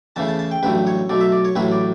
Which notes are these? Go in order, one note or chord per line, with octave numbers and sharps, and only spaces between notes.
E2 C#3 E3 A3 A5
A5
A5
G5
A1 G2 F#3 A3 B4
C#5
B1 B2 A3 D5
E5
D5
C#5
A1 A2 F#3 A3 B4
D5